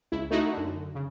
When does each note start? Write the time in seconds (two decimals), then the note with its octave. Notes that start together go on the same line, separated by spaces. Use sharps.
0.12 C#2 E4
0.31 A3 D#4 E4 F#4
0.53 F#2 D3
0.95 C#3